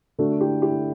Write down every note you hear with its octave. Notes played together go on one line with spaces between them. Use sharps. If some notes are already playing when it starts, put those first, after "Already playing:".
D3 A3 D4 F#4 A4
E4 G4
E4 G4